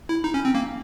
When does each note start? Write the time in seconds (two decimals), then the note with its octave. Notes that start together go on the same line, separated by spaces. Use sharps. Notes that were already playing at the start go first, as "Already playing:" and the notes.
0.09 E4
0.24 D#4
0.34 C#4
0.45 C4
0.55 A#3